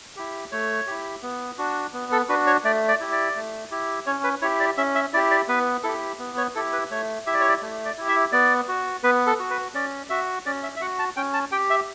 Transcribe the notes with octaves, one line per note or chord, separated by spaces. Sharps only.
E4 G4
A3 C#5
E4 G4
B3
D4 F#4
B3
A4
D4 F#4 B4
C#5
A3 D5
D5
E4 G4
D5
A3
E4 G4
C#4 C#5
B4
E4 G4 C#5
D5
C#4 E5
E5
E4 G4 D5
D5
B3 B4
E4 G4 A4
B3
C#5
E4 G4 A4
B4
A3 C#5
E4 G4 E5
D5
C#5
D5
A3
D5
E4 G4
E5
B3 D5
F#4
B3 B4
A4
F#4
B4
C#4 D5
F#4 E5
C#4 D5
E5
E5
F#4 F#5
A5
C#4 G5
A5
G4 G5
E5